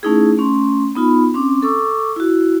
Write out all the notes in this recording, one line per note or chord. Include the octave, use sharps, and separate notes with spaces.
A3 C#4 D#4 E4 G#4
A3 C#4 C6
B3 D#4 F4 B5
C4 C#4 D6
A4 C#6 D6 E6
E4 F#4